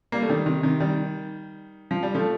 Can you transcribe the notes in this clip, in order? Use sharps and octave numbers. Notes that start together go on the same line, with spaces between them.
G3 A#3
A3
D#3 G3
C3 D#3
C3 D#3
D#3 G3
F3
G3
F3 A3